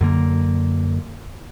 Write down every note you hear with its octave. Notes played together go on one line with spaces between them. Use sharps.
F#2 D3 A#3